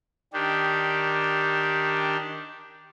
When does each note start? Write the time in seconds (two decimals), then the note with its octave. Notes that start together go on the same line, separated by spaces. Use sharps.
0.33 D#3 D4 G4